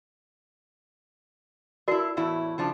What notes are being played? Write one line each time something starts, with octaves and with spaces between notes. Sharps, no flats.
A3 D#4 E4 F#4 A#4 D5
E2 A2 E4
C#3 F3 D4